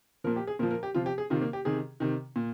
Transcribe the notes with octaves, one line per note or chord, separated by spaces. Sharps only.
A#2 F3 A#4
G4
G#4
A#2 F3 A#4
A#4
G4
C3 F3 F4
G4
G#4
C3 D#3 F4
A#3
G4
C3 D#3 G#4
C3 D#3
A#2